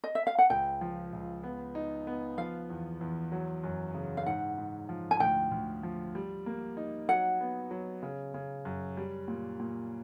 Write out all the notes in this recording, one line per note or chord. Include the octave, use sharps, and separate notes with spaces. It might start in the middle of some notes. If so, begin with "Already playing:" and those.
D#5
E5
F5
F#5
C#2 G5
F3
C#2
B3
D#4
B3
F3 F5
E2
E2
F#3
F#2
C#3
F5
G#2 F#5
G#2
F3
G#5
D2 G5
D2
F3
G3
A#3
D#4
F#3 F#5
B3
F#3
C#3
C#3
F#2
G3
A#2
A#2